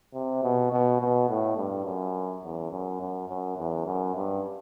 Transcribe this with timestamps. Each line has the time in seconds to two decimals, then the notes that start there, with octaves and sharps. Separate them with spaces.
0.14 C3
0.43 B2
0.72 B2
1.00 B2
1.29 A2
1.57 G2
1.85 F#2
2.43 E2
2.71 F#2
3.01 F#2
3.28 F#2
3.58 E2
3.86 F#2
4.15 G2